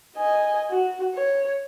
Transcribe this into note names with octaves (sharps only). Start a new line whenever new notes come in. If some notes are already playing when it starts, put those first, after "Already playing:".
D#5 G#5
F#4
C#5